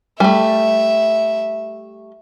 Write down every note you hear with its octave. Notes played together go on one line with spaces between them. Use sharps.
G3 A3 E5